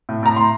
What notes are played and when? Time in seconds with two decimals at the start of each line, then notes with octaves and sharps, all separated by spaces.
0.09 A2
0.23 A2 A#5
0.36 A2 C6